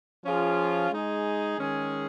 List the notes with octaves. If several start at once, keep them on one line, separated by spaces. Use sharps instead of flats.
F3 C#4 F4 G#4
G#3 D#4 G#4
D#3 G#3 C#4 G#4